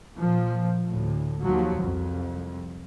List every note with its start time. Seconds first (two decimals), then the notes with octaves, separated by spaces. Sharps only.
0.17 A#2 F3
0.87 D2 A2
1.42 D#2 F3 F#3
1.80 C2 F2